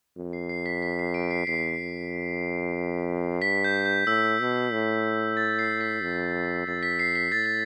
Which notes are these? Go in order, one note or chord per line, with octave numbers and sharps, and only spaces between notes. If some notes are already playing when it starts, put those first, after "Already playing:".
F2
C7
C7
B6
B6
C7
D7
C7
E2 C7
F2
G2 B6
G6
G6
A2 E6
B2
A2
A6
C7
B6
F2
F2 A6
B6
C7
B6
A2 A6
A6